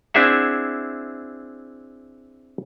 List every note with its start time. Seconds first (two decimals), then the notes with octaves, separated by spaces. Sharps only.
0.14 C4 D4 E4 G#4 E5 F#5